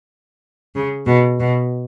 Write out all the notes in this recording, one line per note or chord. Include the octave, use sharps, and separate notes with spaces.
C#3
B2
B2